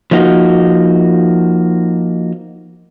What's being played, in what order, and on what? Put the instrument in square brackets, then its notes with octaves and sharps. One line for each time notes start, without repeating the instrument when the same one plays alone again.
[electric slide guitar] F3 A#3 D#4 F#4